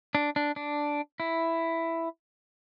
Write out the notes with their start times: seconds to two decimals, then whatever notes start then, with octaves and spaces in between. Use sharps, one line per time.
0.15 D4
0.36 D4
0.56 D4
1.20 E4